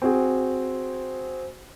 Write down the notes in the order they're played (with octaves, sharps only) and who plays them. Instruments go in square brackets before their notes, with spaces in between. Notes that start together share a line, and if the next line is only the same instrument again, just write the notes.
[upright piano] C4 F#4 G#4